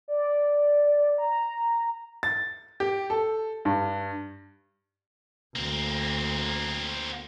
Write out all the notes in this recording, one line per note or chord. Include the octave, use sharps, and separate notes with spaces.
D5
A#5
A6
G4
A4
G2
D2 A#3 C4